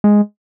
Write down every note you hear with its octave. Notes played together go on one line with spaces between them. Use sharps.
G#3